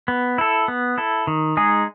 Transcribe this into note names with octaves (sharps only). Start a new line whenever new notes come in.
B3
E4 A4
B3
E4 A4
D#3
G#3 D#4 G#4